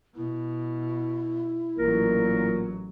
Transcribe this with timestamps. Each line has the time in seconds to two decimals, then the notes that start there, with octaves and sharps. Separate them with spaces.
0.16 B2 E4
1.78 A1 A#2 F#3 A#4